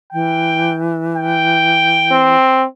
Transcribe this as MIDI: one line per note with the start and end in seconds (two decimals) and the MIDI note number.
0.13 2.36 52
0.13 0.76 79
1.17 2.32 79
2.11 2.64 60